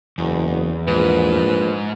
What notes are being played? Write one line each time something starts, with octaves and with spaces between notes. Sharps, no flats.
F#1 E2
A#1 G#2 B4